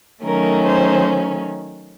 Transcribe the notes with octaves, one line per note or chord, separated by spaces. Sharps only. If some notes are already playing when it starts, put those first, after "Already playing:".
D#3 F#3 A3 C#4 A#4
C5